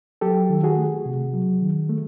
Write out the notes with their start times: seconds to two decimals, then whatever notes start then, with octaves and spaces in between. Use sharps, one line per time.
0.21 F#3 G4 A4
0.50 D#3
0.64 F#4 G#4
0.77 A3
1.05 C3
1.33 F#3
1.62 D#3
1.89 A3